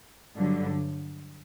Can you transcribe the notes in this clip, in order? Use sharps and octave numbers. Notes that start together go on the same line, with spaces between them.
G2 D3 F#3